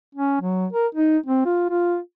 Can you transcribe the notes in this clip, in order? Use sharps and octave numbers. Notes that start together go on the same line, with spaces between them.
C#4
F#3
A#4
D#4
C4
F4
F4